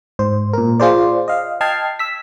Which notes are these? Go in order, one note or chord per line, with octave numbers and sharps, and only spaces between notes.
G#2 C5
A#2 A#4
F4 G#4 C5 D5
D#5 F5
D#5 G5 A5 F6 G#6 C7
E6 B6